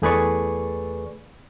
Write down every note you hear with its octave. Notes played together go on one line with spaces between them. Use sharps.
E2 A3 G#4 B4 D5 C#6